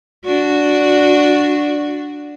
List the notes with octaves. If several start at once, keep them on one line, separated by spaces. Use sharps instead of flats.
D4 F#4